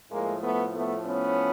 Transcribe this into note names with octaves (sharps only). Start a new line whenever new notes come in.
A2 F3 G#3 A#3
A3 B3
A3 B3
B3 C#4